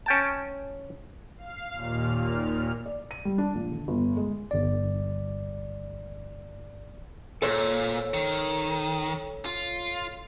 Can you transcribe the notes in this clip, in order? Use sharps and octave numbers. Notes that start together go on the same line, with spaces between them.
C#4 G5 A5
F5
D#2 A#2 F6
D5
D#7
G3
D4
A#1
D3
G1
G#3
G1 D5
A#2 A4 C5 C#5
D#3
F4